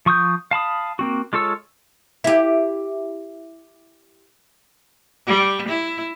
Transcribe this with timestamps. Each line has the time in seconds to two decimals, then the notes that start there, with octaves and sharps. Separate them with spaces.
0.06 F3 C#6 D#6 G6
0.51 F5 A5 B5 D#6
0.99 A#3 C4 F#4
1.33 G#3 F4 A4 C#5 E6
2.24 E4 G4
5.27 G3
5.68 E4